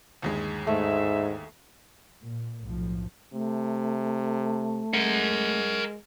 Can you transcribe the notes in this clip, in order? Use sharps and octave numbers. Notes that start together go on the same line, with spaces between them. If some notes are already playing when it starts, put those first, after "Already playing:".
G1 D#2 G#3
G#2 A3 E5
A#2
B1 F2 A2 F3
C3 A3
G#3 A#4 F#5